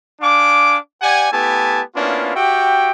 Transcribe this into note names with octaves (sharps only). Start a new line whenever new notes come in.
D4 F5 G#5 D6
G4 D5 F#5 G#5
A3 B3 E4 G4 G#5 A5
A#3 B3 C#4 D4 E4 F4
F#4 G4 E5 G5